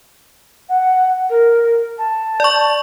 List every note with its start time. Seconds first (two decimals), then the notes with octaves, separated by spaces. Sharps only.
0.69 F#5
1.29 A#4
1.98 A5
2.40 D5 C#6